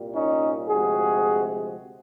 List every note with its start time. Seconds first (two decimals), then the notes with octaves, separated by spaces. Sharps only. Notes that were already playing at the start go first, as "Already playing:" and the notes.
Already playing: C2 A#2 G3
0.14 C#4 D#4
0.68 D2 C3 F3 G#3 F#4 G#4